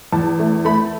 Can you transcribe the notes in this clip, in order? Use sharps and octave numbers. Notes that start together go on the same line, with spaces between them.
E2 A5
A3
A3 B5